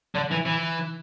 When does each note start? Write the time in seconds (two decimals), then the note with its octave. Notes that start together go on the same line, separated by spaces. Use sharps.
0.15 D3
0.31 E3
0.45 E3